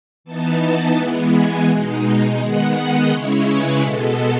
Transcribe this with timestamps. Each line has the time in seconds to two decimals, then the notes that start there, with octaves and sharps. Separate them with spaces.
0.24 E3 B3 D#4 A5
0.60 A5
0.96 E3 G#3 B3
1.32 G#5
1.67 B2 G#3 D#4
2.39 D#3 G#3 B3 F#5
2.74 D#5
3.10 C#3 G#3 C#4 E4 C#5
3.46 B4
3.81 B2 G#3 B3 A4